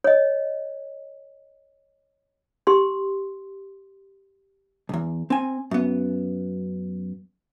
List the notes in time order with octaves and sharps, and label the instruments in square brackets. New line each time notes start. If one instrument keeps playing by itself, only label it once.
[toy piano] C#5 D#5
G4 C6
[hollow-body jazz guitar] B1 E2
C4 G#5
F#2 B3